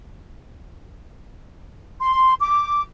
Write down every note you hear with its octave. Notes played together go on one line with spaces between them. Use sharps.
C6
D6